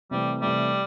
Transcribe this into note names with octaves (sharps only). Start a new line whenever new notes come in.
C3 E3 G3 A3
C3 E3 G3 A3